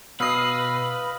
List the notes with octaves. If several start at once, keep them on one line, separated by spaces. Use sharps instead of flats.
B2 B4 D#5 F5 B5 D#6 E6 C7